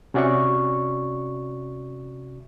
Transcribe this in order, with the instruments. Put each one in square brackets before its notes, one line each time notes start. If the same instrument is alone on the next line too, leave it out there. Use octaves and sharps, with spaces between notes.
[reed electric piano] C3 C#4 F#4 D5 E5 C#6